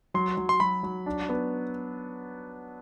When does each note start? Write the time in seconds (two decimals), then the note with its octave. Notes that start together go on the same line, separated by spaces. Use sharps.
0.14 F#3 C6
0.37 F#3
0.49 C6
0.60 F#3 B5
0.83 F#3
1.06 D4
1.29 B3